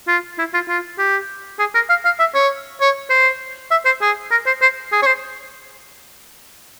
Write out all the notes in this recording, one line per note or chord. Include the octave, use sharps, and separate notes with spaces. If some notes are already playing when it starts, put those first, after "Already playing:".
F4
E4
F4
F4
G4
G#4
A#4
F5
F5
E5
C#5
C#5
C5
E5
C5
G#4
A#4
C5
C5
G#4
C#5
C5